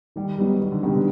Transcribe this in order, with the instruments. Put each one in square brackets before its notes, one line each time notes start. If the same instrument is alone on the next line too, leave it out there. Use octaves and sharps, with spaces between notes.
[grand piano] D#3 [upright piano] G3
[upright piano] F#3 [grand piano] G3 B3 D#4
[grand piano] D#3
[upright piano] D3
[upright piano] D#3 [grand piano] G3 B3 D#4
[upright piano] D3